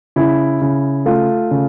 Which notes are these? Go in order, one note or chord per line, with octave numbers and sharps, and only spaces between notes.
C#3 E4
C#3
A3 F4
C#3